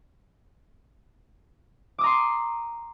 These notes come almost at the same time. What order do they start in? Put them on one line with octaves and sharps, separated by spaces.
D6 D#6 A#5 C6 C7